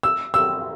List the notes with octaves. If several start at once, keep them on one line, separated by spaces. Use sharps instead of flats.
E6
E6